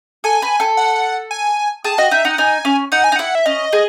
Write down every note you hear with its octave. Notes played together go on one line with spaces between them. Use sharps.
A4 G#5
B4
A4
F#5
G#5
G#4 A5
F#4 D#5
D#4 E5
D#4 F#5
D#4 G#5
C#4
D#4 F#5
G#5
D#4
E4 F#5
E5
C#4 D#5
G#4